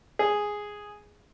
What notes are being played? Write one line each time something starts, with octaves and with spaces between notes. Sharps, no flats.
G#4